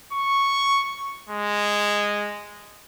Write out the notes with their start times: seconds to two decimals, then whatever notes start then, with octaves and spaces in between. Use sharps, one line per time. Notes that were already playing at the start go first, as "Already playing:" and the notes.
0.12 C#6
1.29 G#3